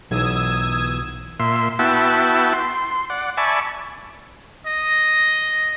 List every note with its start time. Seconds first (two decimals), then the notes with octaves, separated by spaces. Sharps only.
0.11 B1 E3 F#3 B3 D#6 E6 G#6
1.40 A#2 E5 C6
1.79 B3 E4 F#4 E5 G5 A5
2.53 C6
3.10 D5 F#5
3.37 D5 E5 G#5 A5 B5 C#6
4.66 D#5